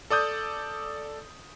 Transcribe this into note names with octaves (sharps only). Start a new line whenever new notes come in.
A4 D5 D#6 G6